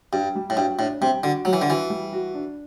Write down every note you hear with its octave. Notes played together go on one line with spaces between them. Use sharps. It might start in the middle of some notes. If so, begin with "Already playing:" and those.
G2 G4
G3
A2
G2 F#4
A2 D4
C3 G3
D3 F#4
F#3 G3
E3
D3
E3 F#4
G3
F#4
D4